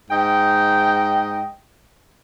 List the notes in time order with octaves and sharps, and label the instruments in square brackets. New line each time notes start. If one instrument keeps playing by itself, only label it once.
[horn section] G#2 D#5 G5